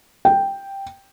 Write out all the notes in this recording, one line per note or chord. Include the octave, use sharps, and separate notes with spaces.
G5